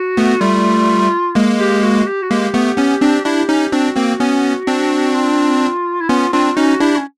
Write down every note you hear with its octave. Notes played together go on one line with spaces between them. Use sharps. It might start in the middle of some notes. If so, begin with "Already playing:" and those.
Already playing: F#4
A3 B3
G3 A3 F4
G#3 A#3
G4
F#4
G4
F#4
G#3 A#3 G4
A3 B3
B3 C#4
C4 D4
D4 E4 G4
C#4 D#4
C4 D4 F#4
A#3 C4
B3 C#4
C4 D4
F4
E4
B3 C#4 F4
C4 D4 F4
C#4 D#4 F#4
D4 E4 G4
C#4